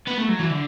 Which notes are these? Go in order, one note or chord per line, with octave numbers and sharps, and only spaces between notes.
B3
A3
F#3
E3
D3